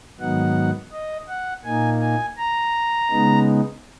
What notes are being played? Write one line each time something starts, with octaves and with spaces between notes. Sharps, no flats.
G#2 D#3 F#3 B3 D#4 F#5
D#5
F#5
A#2 A#3 D#4 G#5
G#5
A#5
C#3 G#3 B3 D#4